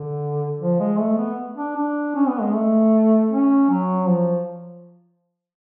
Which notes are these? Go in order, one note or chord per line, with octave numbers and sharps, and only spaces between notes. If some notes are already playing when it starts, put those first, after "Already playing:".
Already playing: D3
F3
G#3
A3
B3
D4
D4
C#4
B3
G#3
A3
C#4
F#3
F3